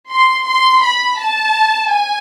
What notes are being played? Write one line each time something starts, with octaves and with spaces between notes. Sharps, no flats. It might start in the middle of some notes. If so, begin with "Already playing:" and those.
C6
C6
B5
A5
G#5